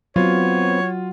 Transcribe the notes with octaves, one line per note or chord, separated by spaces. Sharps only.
F#3 B3 C4 F4 C#5